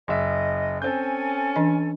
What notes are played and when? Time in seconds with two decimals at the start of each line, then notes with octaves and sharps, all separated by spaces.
0.08 F#1 D#5 E5
0.82 C4 C#4 A4 G#5 G6
1.56 E3 D4 D#5